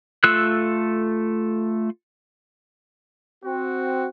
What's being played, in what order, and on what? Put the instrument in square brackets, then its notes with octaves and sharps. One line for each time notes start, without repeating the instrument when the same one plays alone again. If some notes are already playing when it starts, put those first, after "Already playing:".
[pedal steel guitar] A3 F4 A4 E6 F#6
[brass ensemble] C4 F#4